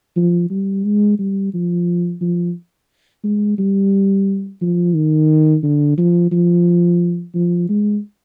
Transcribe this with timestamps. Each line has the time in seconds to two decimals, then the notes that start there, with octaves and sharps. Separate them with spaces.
0.16 F3
0.50 G3
0.84 G#3
1.19 G3
1.54 F3
2.21 F3
3.24 G#3
3.58 G3
4.61 F3
4.95 D#3
5.63 D3
5.98 F3
6.31 F3
7.34 F3
7.69 G#3